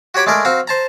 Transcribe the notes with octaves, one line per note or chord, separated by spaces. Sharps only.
F#4 G4 C#5 B5 D6
G#3 A3 D4 A#4 D6
C4 F#4 F5 A#5
C5 A5 A#5